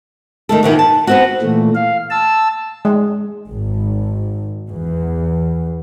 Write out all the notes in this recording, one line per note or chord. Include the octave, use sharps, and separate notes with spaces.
D#3 A3 A4
A#2 D#3 E3 F#4
A5
B3 C4 F#4
A#2 E3 A3
F5
A5 E6
G#3
G#1
E2